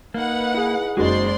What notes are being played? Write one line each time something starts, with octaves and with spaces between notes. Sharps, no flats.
A#3 D#4 B4 F#5
E4 G#4
F#1 G#3 D#4 F#4 C5 D5 C6